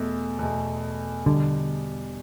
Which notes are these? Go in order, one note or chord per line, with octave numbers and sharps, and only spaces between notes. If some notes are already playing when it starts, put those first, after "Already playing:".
Already playing: E2 B2 A3
E2 B2 A3
E2 B2 D3 G3